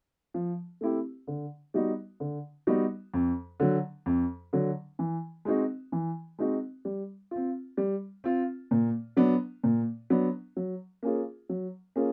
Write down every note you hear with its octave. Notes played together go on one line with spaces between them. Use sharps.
F3
A3 C4 E4 G4
D3
G3 B3 D#4 F#4
D3
G3 B3 D#4 F#4
F2
D3 F#3
F2
D3 F#3
E3
G#3 C4 D#4 F#4
E3
G#3 C4 D#4 F#4
G3
C4 F4
G3
C4 F4
A#2
F#3 B3 D4
A#2
F#3 B3 D4
F#3
A#3 C#4 F4 G#4
F#3
A#3 C#4 F4 G#4